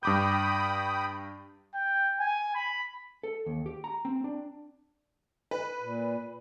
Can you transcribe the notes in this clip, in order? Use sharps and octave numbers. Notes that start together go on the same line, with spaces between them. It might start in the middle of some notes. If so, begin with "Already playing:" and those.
G2 G5 B5 D6 D#6 G6
G5
G#5
B5
A4
D#2
G4
A#5
C4
D4
B4
A#2